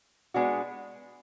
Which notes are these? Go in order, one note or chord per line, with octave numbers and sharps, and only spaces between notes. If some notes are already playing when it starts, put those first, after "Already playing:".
G#3 B3 D4 F#4